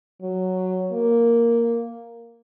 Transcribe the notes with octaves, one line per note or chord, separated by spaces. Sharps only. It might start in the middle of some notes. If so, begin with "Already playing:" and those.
F#3
A#3